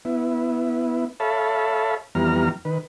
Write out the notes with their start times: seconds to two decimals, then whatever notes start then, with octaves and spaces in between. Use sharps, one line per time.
0.05 B3 E4
1.20 A4 C#5 E5 F5 A5 B5
2.15 F2 E3 G3 B3 A#5 F6
2.65 D#3 B4